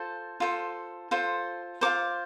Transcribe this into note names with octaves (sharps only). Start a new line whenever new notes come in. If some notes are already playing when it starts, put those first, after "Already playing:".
Already playing: F4 A4 C5 A5
F4 A4 C5
F4 A4 C5
F4 A4 C5 D6